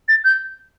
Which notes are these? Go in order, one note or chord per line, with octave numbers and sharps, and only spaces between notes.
A6
G6